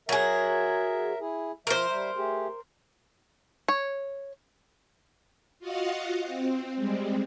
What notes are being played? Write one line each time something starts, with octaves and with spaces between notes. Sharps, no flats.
F#3 G#4 A#4 E5
E4 G#4
F3 A#4 C5 E5
G3 E5
A3 G4 G#4
C#5
F4 F#4 D#5 F5 F#5
C4
G3 G#3 C4